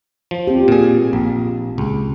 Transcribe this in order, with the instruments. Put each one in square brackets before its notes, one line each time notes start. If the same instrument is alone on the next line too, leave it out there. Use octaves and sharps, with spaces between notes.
[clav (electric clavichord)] F3
[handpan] C4 F4 G4
[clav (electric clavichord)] A#2 G#4
A#1
C#2